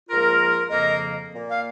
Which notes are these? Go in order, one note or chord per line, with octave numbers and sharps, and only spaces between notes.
G#2 F3 A#3 F4 A#4
F2 C#3 F3 A#3 A#4 D#5
A#2 A#3
F5